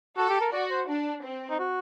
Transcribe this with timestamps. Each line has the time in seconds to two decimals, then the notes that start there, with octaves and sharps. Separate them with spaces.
0.17 F#4 A4
0.29 G4
0.41 A#4
0.52 F#4 D5
0.70 C5
0.88 D4
1.23 C4
1.50 D#4
1.59 F#4